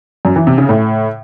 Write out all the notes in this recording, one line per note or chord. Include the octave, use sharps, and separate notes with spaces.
F#2
E3
C3
C#3
A2